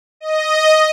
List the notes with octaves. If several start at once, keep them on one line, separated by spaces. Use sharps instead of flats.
D#5